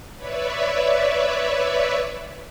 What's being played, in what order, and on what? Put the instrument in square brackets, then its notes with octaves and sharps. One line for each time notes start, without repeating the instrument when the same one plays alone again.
[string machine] B4 C#5 D5 E5